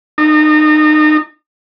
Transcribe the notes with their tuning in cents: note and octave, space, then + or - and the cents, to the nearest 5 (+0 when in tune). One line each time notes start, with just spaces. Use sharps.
D#4 -30